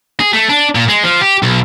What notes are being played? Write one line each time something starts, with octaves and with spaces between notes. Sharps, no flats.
G#4
A3
D4
A#2
G#3
F3
G4
B1